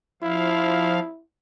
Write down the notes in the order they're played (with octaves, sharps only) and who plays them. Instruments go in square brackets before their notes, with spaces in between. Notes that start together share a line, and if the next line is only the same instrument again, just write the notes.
[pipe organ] F3 F5 [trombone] E4